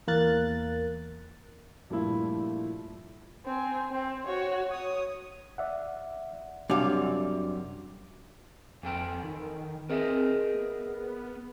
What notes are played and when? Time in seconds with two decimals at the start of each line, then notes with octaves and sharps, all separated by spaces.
0.07 E2 A#3 A#4 F#6 A6
1.90 G2 A#2 F3 A3 E4 F4
3.46 C4 G#5
3.91 C4
4.25 F#4 C#5
4.71 C#5 D#6
5.58 D5 E5 F#5
6.70 F#2 C3 G3 D4 F#4 F5 D6
8.83 F2 E3 A4 G5
9.24 D#3
9.90 C4 G#4 A#4 D#5 E5
10.55 B3